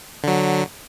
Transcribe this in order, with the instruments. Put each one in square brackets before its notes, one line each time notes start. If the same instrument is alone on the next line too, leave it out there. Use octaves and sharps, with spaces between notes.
[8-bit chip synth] D3 F#3